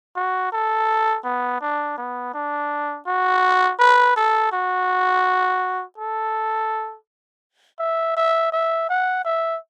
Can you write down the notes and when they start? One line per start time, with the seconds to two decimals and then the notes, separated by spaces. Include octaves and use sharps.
0.16 F#4
0.52 A4
1.24 B3
1.61 D4
1.98 B3
2.34 D4
3.07 F#4
3.79 B4
4.16 A4
4.52 F#4
5.98 A4
7.79 E5
8.17 E5
8.52 E5
8.89 F#5
9.25 E5